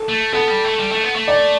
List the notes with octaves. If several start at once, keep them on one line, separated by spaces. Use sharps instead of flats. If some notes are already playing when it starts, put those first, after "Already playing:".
Already playing: A4
A3
B3 A4
G3
A3
G3
A3
B3
A3
D5